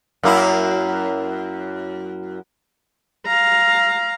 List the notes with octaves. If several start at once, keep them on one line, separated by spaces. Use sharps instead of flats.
F#2 A#3 E4
F5 A#5